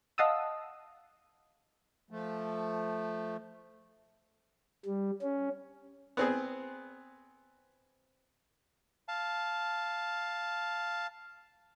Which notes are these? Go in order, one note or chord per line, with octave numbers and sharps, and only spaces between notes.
D#5 F5 F#5 A5 D#6 E6
F3 A3
G3
C#4
B3 C4 G#4
F5 A5